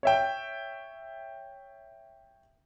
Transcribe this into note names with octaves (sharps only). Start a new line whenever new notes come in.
C#5 E5 G5